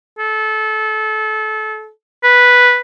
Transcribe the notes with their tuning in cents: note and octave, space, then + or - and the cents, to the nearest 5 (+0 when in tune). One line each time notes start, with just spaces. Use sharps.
A4 -25
B4 -5